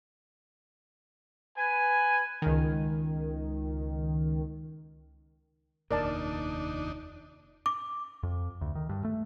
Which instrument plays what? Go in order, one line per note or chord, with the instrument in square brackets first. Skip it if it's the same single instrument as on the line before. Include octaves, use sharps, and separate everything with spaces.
[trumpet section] B4 G#5
[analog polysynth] C#2 D#3
[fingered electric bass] F1 D#2 A#2 [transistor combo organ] D4 D#4 [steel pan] A#4 D5 A5
[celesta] D6
[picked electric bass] F2
D2
D#3
G2
A3